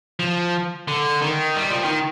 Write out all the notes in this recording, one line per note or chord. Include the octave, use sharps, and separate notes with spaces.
F3
D3
D#3
G3
F3
D#3